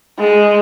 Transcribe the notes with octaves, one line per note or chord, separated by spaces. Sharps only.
G#3